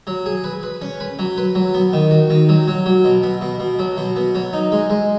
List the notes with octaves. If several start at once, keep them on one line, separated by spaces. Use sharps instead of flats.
F#3
G#4
B4
B4
C#4
B4
F#3
B4
F#3
B3
D#3
F#4
D#3
F#3
F#3
F#3
B2
B3
B2
B2
F#3
B2
B3
F#3
D#4
G#3
G#3